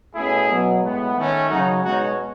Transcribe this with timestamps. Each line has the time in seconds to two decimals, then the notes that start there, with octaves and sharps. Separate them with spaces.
0.15 B2 A3 C#4 E4 G#4
0.49 B2 F#3 B3
0.83 A2 G#3 B3
1.16 D#3 A3 C#4
1.50 C#3 F#3 C#4 D#4 F#4
1.84 B2 G#3 C#4 D#4 F#4